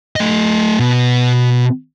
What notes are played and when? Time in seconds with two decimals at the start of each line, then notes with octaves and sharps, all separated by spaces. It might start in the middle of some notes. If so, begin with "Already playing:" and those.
0.16 A3 D#5
0.79 B2